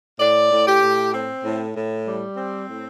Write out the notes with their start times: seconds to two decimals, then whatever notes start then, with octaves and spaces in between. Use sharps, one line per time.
0.19 A2 D5
0.51 A2
0.66 G4
0.82 A2
1.13 C4
1.44 A2
1.75 A2
2.06 G3
2.36 C4
2.68 A2